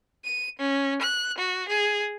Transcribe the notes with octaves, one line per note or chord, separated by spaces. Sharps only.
D#7
C#4
F#6
F#4
G#4